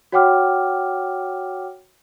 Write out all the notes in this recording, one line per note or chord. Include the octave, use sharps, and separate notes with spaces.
F#4 C#5 F#5 G5 D6 F6